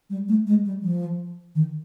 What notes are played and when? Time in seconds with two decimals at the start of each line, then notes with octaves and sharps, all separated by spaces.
0.10 G3
0.29 A3
0.47 G#3
0.65 G3
0.83 F3
1.55 D#3